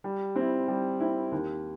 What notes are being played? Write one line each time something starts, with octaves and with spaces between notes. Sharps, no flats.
G3
C4 E4
G3
C4 E4
D#2